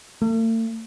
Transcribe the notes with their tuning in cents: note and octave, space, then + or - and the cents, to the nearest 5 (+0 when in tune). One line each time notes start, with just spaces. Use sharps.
A3 +45